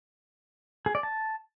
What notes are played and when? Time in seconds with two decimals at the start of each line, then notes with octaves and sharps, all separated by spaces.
0.86 G#4
0.95 D5
1.03 A5